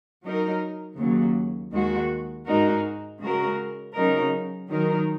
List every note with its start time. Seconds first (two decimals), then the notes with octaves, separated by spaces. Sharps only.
0.24 F#3 D#4 A#4
0.98 D#2 C#3 F#3
1.72 D#2 D#3 G#3 F#4
2.46 G#2 G#3 D#4 F#4 A#4
3.20 C#3 G#3 F#4 A#4
3.95 C#3 F#3 D#4 A#4
4.68 D#3 F#3 D#4 A#4